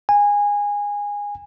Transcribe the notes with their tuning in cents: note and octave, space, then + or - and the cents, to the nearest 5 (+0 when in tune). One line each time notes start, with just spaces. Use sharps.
G#5 -20